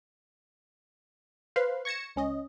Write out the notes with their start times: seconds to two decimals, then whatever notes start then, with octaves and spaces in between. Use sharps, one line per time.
1.56 B4 C5 F5 C6
1.85 C#6 G#6 A#6 C#7 E7
2.16 C#2 C#4 D#5